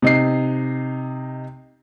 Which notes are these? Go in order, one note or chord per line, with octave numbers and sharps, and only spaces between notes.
C3 D#4 C7